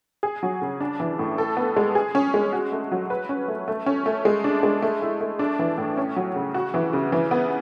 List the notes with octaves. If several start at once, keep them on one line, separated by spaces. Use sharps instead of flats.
G#4
F#3
C#3
D4
E3
A2
A4
B3
G#3
G#4
C#4
G#3
F#4
A3
F#3
B4
C#4
A3
A3
C#4
A3
G#3
D4
G#3
A3
E4
A3
D4
E3
A2
C#4
F#3
C#3
F#4
E3
C#3
E3
B3